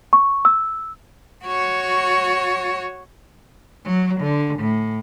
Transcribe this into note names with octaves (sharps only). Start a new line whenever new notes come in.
C#6
E6
F#4 C#5
F#3
D3
A2